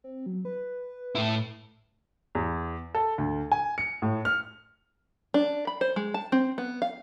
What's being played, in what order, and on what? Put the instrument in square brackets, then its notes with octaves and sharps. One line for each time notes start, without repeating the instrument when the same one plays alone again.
[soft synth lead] C4
F#3
B4
[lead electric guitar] A2 E4
[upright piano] E2
A4
D2
G#5
C#7
A2
F6
[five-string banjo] D4
B5
C5
G#3
A5
C4
B3
F5